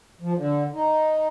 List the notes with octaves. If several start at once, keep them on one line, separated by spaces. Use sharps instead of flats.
F3
D3
D#4